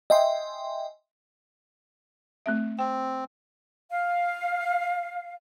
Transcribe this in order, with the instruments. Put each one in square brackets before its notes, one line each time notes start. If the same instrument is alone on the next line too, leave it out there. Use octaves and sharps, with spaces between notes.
[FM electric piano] D#5 E5 G5 G#5 C6
[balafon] A3 C4 E5
[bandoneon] C4 [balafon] G5
[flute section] F5